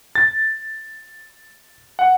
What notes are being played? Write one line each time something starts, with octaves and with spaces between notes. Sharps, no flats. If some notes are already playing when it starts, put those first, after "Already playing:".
A6
F#5